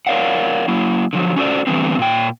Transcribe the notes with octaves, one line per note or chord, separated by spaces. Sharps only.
A#4 C#5 D5 F5 F#5
F#3 A#3 E4
D3 F3 F#3
C#4 F#4 A4 C5 D5
D3 E3 G3 A3 B3 C4
A#2 G5